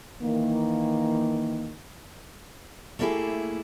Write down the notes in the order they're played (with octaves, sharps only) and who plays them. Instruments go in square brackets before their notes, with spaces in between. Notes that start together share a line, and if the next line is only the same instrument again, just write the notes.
[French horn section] D#3 E3 A#3
[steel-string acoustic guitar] A3 A#3 D4 E4 G4 G#4